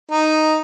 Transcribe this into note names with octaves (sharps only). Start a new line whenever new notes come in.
D#4